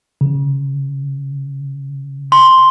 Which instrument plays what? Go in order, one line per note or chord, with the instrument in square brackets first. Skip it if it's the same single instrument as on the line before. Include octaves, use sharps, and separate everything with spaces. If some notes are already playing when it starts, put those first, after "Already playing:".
[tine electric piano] C#3
[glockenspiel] C6